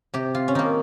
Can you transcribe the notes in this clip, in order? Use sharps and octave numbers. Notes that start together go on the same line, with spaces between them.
C3 G4
F4
C#4
D#3 A#3 D#4